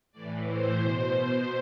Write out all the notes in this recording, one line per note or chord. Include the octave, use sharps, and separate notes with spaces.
A2 E3 D5
C5
B2 C5